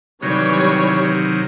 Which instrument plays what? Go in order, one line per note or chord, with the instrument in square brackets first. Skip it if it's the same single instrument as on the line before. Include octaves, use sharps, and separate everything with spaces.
[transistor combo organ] C3 D#3 F#3 [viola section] E3 G3 C#5